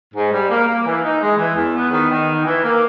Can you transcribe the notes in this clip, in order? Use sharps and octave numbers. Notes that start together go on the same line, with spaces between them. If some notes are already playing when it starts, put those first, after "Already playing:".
G#2
G3
A#3
A#3
E3
D#4
G#3
E3
E2
B3
D#3
D#3
D#4
E3
A#3